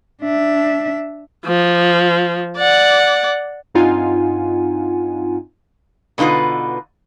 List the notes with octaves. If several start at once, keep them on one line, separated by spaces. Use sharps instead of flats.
D4 E5
F3
D5 F#5
G2 C4 D#4 F4 F#5 G#5
B2 D3 D#4 F4 B4